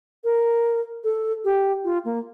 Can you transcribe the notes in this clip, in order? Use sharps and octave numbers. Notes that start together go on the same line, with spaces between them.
A#4
A4
G4
F4
A#3